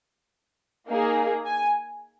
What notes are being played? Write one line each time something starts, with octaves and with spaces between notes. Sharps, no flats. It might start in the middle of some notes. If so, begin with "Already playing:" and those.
A#3 D#4 G#4
G#5